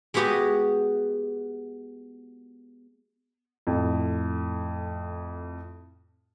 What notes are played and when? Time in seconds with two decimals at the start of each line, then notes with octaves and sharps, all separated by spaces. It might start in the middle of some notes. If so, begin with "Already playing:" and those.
0.14 G#3 B3 F#4 G4 D#5 G#5
3.67 F2 A2